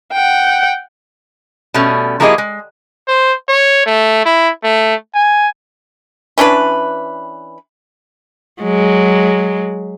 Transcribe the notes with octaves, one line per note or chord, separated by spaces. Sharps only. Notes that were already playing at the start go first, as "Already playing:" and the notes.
F#5 G5
B2 G3 A3 C#4
F3 A#3 E4 G4 G#4 D#5
G#3
C5
C#5
A3
E4
A3
G#5
E3 C#4 D4 B4
F#3 G#3